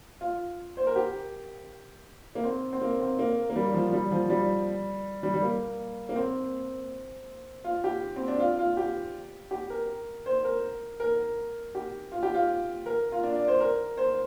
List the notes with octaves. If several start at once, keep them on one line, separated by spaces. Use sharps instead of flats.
F4
C5
A#4
G4
A#3
C4
C4
A#3
C4
A#3
A#3
G3
F3
G3
F3
G3
G3
G3
A#3
A#3
C4
F4
G4
C4
D4
F4
F4
G4
G4
A#4
C5
A#4
A#4
G4
F4
G4
F4
A#4
F4
D4
D5
C5
A#4
C5